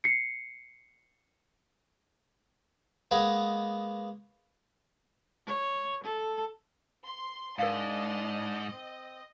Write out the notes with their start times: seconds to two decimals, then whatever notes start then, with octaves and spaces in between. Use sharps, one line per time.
0.04 C7 C#7
3.11 G#3 A#3 B3 C#5 D#5
5.47 C#5
6.04 A4
7.04 C6
7.59 G#2 D4 A#4 D#5 F5 C6
8.71 C4